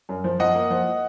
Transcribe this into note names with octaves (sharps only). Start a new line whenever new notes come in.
F#2
F3
F3 D#5 F#5
A#3
F3